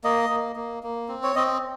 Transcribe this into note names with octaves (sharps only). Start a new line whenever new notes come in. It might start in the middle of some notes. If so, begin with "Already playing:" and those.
A#3 D#5
A#3
A#3
A#3
C4
C#5
C4 D#5